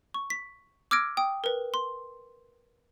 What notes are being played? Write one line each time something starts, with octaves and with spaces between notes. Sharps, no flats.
C#6
B6
D6 E6 F6 G#6 A#6 D7
G5 D#6
A#4 B4
C6